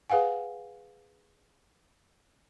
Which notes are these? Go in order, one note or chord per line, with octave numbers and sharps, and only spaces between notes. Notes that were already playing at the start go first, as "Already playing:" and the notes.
G#4 B4 F5 F#5 G#5